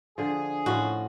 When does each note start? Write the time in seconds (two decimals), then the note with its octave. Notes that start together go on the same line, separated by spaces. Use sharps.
0.18 D3 F3 G#4
0.66 A2 F3 C#4 F#4